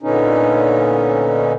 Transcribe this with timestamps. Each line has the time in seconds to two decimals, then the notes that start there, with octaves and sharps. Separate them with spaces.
0.01 A#2 D3 B3 C#4 D#4